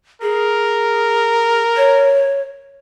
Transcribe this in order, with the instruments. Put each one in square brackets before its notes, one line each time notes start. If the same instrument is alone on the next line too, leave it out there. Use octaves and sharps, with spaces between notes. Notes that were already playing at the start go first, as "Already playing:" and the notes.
[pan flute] G#4 [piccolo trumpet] A#4
[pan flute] C#5